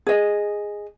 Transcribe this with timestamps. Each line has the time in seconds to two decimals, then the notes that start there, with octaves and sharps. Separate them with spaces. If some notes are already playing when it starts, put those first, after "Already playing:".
0.07 G#4 D#5